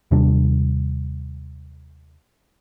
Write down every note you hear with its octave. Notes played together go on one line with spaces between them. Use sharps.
D#2 C3 G3 D4